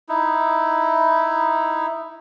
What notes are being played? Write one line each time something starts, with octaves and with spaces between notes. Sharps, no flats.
D#4 E4